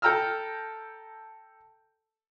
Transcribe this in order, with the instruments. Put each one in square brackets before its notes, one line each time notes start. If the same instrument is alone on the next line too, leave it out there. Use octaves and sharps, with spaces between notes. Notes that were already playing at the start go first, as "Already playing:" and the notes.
[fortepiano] A4 G5 A#5 E6 F6